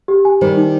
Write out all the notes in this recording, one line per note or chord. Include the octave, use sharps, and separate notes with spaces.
G4
G#5
D#3 G3 C5
D#4